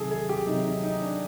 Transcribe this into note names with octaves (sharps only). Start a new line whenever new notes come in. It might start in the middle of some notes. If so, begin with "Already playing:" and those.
Already playing: C3 D#3 F#3 G#4 A4
G#4
G4
C3 D#3 F#3 D#4
D#4
D#4
D4